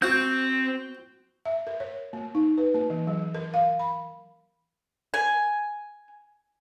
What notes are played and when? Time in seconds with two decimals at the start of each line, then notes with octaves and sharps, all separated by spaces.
0.02 C4 F#4 F#5 G6
1.45 E5
1.67 A#4
1.80 C#5
2.13 A#3
2.35 D#4
2.58 B4
2.74 A#3
2.90 E3
3.07 F#3
3.35 A#4
3.54 F5
3.79 B5
5.14 G#5